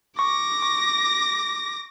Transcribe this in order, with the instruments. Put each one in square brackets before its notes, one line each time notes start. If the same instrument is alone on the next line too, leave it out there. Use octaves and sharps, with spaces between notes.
[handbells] C#6 [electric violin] D6 A#6
[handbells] C#6